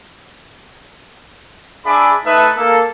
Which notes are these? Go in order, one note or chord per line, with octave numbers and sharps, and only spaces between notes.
D4 G#4 E5 G#5 B5 D6
A3 D#4 A4 B4 E5 D#6
A#3 A4